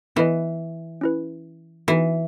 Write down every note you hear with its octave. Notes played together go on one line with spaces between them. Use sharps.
E3 B3 E4 B4 D#5
C#4 E4 B4
E3 B3 D#4 F#4